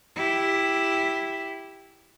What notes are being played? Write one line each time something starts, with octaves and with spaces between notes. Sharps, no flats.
E4 G4